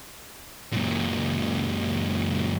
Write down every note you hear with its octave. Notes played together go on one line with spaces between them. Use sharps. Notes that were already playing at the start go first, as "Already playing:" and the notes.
F#2 A#2